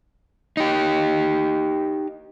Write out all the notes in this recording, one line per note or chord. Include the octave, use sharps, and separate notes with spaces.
D#4 G4